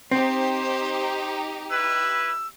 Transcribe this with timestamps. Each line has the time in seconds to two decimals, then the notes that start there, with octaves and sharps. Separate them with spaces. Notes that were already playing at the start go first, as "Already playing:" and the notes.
0.11 C4 D#4 G4 C5
1.70 E4 B4 E6